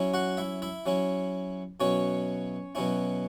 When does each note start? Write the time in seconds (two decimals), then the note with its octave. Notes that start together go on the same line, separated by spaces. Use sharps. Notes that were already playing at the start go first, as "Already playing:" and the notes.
Already playing: F#3 C#4 E4
0.14 F#4 F#5
0.37 E4 E5
0.62 E4 E5
0.86 F#3 C#4 E4
1.80 B2 F#3 C#4 E4 C#5
2.75 B2 F#3 C#4 E4